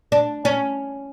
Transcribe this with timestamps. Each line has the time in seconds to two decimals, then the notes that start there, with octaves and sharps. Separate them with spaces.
0.12 D4
0.45 C#4